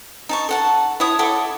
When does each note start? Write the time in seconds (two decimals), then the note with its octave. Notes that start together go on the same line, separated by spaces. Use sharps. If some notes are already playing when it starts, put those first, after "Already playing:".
0.29 D#4 A5 C#6
0.49 A4 F#5 A5
1.00 E4 C#5 D#6
1.19 E4 A4 F#5 D6